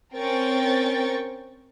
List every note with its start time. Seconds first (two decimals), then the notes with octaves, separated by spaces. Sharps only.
0.14 C4 C#4 A#4 G5 C#6 A6